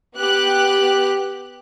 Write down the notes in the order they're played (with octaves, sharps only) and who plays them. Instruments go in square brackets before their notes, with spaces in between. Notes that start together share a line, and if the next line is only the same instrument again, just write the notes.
[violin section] B3 G4 F#6